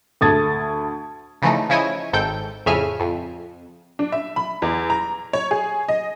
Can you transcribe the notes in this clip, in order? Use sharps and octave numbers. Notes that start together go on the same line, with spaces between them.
D2 A3 A5 D#6 G#6 A6
C#3 E3 F3 A3 D#4
C#3 F3 E4 C#5 D#5 G#5
G#1 G#2 A4 G5 G6
F2 A2 C#3 E5 G#5 F6
F2
D4
E5
B5
E2
A#5
C#5
G#4
D#5